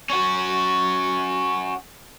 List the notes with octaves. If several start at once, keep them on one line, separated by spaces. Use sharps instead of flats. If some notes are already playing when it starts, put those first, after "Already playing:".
C#4 F#4